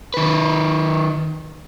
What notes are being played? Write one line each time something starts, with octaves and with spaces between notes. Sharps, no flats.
D#3 B4